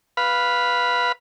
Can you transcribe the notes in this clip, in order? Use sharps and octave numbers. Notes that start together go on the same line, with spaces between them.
B4 F5 B5